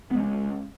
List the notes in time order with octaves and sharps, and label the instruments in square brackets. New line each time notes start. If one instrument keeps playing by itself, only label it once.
[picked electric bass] B3
G#3
C#4